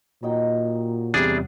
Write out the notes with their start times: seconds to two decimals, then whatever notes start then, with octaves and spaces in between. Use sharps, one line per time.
0.23 A#2 F#3 D#4 G5
1.14 E2 C3 G3 D4 G#4